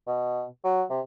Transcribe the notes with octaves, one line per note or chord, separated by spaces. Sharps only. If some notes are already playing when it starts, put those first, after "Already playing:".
B2
F#3
C3